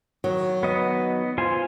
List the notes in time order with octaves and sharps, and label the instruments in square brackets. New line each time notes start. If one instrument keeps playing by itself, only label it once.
[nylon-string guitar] D#3 F#3
[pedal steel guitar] B3 D#5
F4 C5 G#5